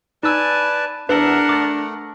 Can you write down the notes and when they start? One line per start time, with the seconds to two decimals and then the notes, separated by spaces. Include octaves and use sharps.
0.23 D#4 B4 D5 G#5 A5 E6
1.09 E2 D4 A#4 B4 E5 F#5
1.49 A3 D6 A6